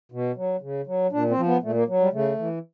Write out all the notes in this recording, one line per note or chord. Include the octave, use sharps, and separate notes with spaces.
B2
F#3
C#3
F#3
A#2 D4
C4
F3
B3
A#2 A3
A#3
F#3
G3
C#3 A3
E3